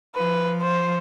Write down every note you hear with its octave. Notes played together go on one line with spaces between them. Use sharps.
F3 B4
C5